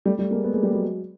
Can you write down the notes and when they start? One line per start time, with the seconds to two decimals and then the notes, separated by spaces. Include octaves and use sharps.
0.06 G3 A3
0.19 G3 A3
0.31 G#3 A#3
0.44 A3 B3
0.54 G#3 A#3
0.63 G3 A3
0.73 F#3 G#3